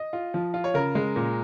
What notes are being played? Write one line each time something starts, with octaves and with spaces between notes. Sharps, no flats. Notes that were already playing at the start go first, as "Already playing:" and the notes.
Already playing: D#5
F4
F3
F4
C#5
C#3 A#4
G#3
A#2